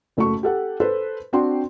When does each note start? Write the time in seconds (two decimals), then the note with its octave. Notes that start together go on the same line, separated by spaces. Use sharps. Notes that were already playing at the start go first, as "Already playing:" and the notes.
0.17 F#1 A3 F#4 C#6
0.43 G4 A4 F#5
0.80 A4 B4 C5
1.33 C4 D4 F#4 G5 C6